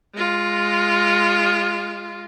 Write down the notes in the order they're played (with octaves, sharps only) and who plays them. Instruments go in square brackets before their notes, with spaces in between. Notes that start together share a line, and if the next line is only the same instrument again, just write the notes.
[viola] G#3 F4